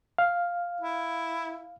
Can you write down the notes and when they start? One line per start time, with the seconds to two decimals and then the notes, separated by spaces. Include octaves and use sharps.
0.18 F5
0.81 E4